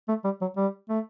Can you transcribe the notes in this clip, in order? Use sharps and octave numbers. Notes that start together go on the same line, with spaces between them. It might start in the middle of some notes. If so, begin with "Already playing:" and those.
A3
G3
F#3
G3
A3